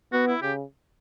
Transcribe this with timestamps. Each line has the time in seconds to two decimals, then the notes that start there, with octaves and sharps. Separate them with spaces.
0.12 B3 F#4
0.28 E4
0.42 C#3 G4